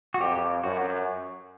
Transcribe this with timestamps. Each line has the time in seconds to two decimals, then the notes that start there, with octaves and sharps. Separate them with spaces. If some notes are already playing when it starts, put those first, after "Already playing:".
0.14 F#4
0.20 F2 G4
0.64 F#2 F#4